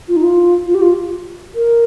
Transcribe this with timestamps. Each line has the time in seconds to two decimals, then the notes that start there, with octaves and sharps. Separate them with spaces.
0.08 F4
0.16 D#4
0.23 F4
0.67 F4
0.74 G4
0.82 F4
1.55 A#4